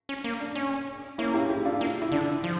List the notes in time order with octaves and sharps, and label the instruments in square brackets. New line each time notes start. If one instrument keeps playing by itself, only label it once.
[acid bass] C#4
A#3
[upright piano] D4
[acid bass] C#4
[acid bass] A#3 [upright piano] C#4 E4
[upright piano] E4 G4
E4 G4
D4 F4
[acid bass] A#3
[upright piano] E4
[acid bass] D3 [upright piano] D4
[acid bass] F3